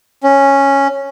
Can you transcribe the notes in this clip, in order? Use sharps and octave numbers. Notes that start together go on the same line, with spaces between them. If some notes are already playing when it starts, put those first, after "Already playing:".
C#4